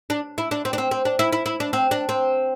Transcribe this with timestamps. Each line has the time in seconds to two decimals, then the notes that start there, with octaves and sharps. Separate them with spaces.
0.10 D4
0.38 E4
0.51 D4
0.65 C4
0.73 D4
0.78 C4
0.91 C4
1.05 D4
1.19 E4
1.33 E4
1.46 E4
1.60 D4
1.73 C4
1.91 D4
2.09 C4